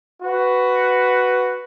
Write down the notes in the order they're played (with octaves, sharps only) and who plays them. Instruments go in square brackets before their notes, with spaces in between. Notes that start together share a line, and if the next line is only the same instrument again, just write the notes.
[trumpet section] F#4 B4